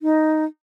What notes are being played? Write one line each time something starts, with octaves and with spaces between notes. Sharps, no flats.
D#4